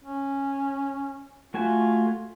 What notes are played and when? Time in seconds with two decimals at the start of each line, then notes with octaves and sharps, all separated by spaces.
0.04 C#4
1.54 A3 F4 F#4 G#5